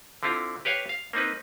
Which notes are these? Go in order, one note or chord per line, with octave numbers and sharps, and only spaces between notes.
D3 C4 E4 F4
G4 B4 C#5 F5 G5
F5
A#3 C4 D#4 B4